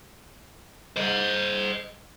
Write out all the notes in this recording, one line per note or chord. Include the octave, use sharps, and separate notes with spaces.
C5 D#5